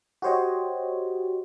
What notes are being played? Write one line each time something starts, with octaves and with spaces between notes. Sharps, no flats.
F#4 G4 C5 C#5 D#5